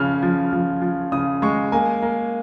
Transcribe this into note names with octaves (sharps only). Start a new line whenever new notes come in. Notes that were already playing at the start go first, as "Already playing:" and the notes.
Already playing: C#3 F3 C#4 F6
F3
F3
F3
C#3 D#6
G#3 C#6
A#3 G#5
A#3